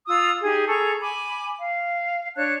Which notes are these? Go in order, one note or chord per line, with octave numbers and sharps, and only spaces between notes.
F4 D#6 E6
D#4 G4 G#4
G#4 A4 A#5 C#6
G#5 B5 D6
F5
D4 C#5 A5 F#6